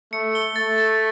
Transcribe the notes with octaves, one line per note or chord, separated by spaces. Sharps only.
A3 C#7
G7
A3 A6
A6